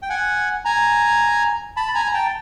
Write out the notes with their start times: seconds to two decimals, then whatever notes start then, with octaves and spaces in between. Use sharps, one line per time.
0.02 G5
0.09 F#5 G#5
0.65 G#5 A#5
1.77 A5 B5
1.88 B5
1.95 G#5 A#5
2.05 A#5
2.14 G5 A5